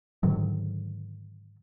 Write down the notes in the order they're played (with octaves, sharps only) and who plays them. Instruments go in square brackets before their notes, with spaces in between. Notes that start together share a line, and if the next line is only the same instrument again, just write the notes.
[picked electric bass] G#2 D3 D#3 F#3